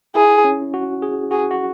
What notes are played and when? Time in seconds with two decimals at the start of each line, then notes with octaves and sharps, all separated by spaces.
0.15 E4 G#4
0.44 C#4
0.74 F#4
1.02 G#4
1.31 F#4 G#4
1.51 F#4